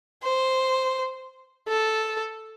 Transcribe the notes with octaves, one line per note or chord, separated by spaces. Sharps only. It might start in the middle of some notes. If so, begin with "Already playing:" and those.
C5
A4